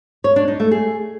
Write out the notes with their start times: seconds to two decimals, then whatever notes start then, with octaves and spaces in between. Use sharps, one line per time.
0.24 C#5
0.36 D4
0.48 D#4
0.60 A3
0.71 G#4